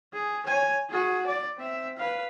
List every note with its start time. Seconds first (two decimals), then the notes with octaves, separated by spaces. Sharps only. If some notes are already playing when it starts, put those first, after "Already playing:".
0.14 G#4
0.47 C#5 G#5
0.90 F#4 G#4
1.26 D5
1.57 C4 E5
1.97 B4 F5